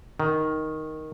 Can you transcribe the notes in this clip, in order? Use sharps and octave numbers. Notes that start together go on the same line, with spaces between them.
D#3